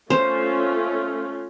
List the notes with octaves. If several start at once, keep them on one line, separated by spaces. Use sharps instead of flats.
A3 C#4 F4 C5